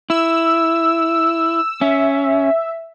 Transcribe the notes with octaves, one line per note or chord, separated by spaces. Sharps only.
E4 E6
C#4 E5